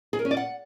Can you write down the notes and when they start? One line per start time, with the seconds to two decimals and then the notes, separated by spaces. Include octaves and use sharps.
0.13 G#4
0.19 A#4
0.25 C#4
0.31 D5
0.37 F#5